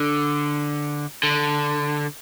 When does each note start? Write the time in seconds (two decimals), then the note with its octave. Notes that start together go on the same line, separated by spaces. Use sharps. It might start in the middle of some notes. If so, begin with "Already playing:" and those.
Already playing: D3
1.23 D3